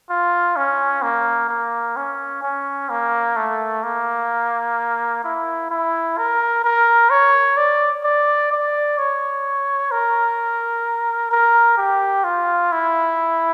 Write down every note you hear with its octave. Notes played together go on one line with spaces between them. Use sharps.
F4
C#4
A#3
A#3
C#4
C#4
A#3
A3
A#3
E4
E4
A#4
A#4
C#5
D5
D5
D5
C#5
A#4
A#4
G4
F4
E4